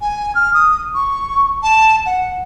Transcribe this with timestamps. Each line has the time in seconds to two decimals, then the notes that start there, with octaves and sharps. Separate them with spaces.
0.01 G#5
0.35 F6
0.54 D#6
0.95 C#6
1.63 A5
2.06 F#5